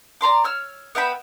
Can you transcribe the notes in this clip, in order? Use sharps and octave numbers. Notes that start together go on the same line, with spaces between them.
D5 A#5 C6 D6
C#5 E6 F6
B3 E5 G5 B5